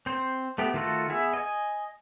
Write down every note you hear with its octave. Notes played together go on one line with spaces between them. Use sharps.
C4 C5
A3 B3 G4
D#3 A3 F4 F#4 A4
B3 G#4 E5
D#5 G#5